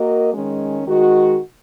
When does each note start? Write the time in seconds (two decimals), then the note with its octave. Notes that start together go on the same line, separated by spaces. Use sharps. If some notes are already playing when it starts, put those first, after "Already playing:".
Already playing: A#3 F#4 A#4 D#5
0.32 D#3 G#3 C#4
0.85 D#3 G#3 F#4 D#5